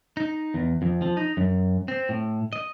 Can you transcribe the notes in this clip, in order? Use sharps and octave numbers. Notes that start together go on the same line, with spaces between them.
D#4
E2
F2
F3
D#4
F#2
C4
A2
D#5